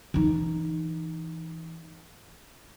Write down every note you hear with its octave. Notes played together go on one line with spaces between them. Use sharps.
E3 D#4